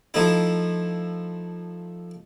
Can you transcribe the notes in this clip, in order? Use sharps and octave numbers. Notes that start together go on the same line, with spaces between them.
F3 A3 D#4 E4